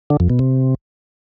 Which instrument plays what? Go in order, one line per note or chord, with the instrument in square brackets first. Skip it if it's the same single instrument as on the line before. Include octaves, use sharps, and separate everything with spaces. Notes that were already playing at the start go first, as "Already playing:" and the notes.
[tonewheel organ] D3
F2
B2
C3